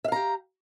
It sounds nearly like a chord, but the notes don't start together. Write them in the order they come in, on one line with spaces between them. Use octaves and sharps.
E5 F5 A#5 G4